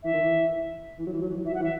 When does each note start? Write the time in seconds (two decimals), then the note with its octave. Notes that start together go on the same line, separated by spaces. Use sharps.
0.03 E3 E5
0.13 D#3
0.22 E3
0.99 E3
1.07 F#3
1.13 E3
1.21 F#3
1.29 E3
1.36 F#3
1.44 E3 E5
1.51 F#3
1.54 F#5
1.60 E3 E5